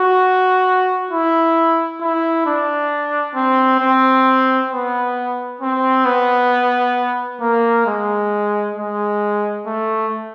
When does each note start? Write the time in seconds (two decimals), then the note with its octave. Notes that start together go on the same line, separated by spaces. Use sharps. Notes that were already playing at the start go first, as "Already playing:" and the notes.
Already playing: F#4
1.11 E4
2.01 E4
2.46 D4
3.36 C4
3.80 C4
4.71 B3
5.61 C4
6.05 B3
7.41 A#3
7.87 G#3
8.76 G#3
9.67 A3